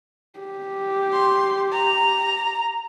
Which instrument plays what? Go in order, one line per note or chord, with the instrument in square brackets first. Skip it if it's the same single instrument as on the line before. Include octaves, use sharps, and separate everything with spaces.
[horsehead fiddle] G4
[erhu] C6
A#5